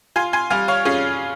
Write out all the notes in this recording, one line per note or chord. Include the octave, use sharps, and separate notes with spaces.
F4 G#5 C6
G#5 C6
G3 F5 G#5
C#5 F5
C#4 F4 G#4